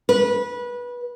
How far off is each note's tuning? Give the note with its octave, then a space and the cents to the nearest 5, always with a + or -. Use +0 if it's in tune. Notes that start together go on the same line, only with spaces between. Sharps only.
B4 -20